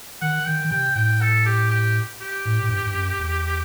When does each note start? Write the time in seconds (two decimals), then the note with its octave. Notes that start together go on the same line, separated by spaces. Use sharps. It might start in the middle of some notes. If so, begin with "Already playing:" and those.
0.22 D#3 F#5
0.46 D#3 G5
0.64 D#3
0.71 C3 G5
0.95 A2 G5
1.21 A4
1.46 G4
1.71 G4
2.21 G4
2.45 A2
2.62 A2
2.70 G2
2.85 G2
2.94 F#2
3.19 E2